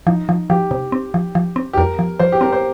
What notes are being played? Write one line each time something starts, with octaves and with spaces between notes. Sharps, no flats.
F3 D#4
F3
F3 G4
C3
C4
F3
F3
C4
G4
F2 A#4
F3
F3 C5
G4
C4 A#4
C5